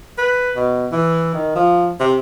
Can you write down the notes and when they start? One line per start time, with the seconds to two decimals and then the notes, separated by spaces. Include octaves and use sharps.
0.18 B4
0.56 B2
0.92 E3
1.34 D#3
1.55 F3
2.00 C3